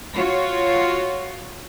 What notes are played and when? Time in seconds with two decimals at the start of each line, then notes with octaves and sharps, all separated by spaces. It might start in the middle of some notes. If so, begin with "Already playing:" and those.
0.15 F4 F#4 C#5